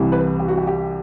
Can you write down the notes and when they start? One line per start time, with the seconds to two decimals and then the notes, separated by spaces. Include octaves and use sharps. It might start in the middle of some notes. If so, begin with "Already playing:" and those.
Already playing: C2 C3 E3
0.12 B4
0.39 G4
0.48 F#4
0.57 G4
0.67 G4